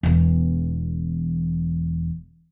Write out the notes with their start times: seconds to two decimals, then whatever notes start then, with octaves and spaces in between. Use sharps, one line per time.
0.03 E1 E2